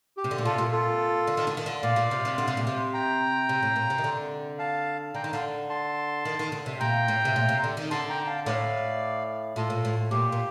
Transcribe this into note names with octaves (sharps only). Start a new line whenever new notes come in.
G4
C3
D3
A#2
C3 F4 A4
A#2
F4 A4
D3
D#3
D3
D#3
D3
A#2 D5 F5
A#2
C3
C3
D3
C3
A#2
C3
G5 A#5
C3
A2
A#2
C3
D#3
D3
F5 A5
D3 G5 A#5
D#3
D3 F5 A5
A5 C6
D#3
D#3
D3
C3
A#2 G5 A#5
A2
C3
A#2
C3
D3
D#3
D3 A5 C6
G5 A#5
G5
F5 A5
A2 D5 F5
A2 F4 A4
A#2
A2
A#2 G4
A#2